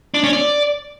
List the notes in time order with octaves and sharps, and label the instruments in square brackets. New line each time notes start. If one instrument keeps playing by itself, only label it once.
[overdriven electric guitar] D4
C#4
D5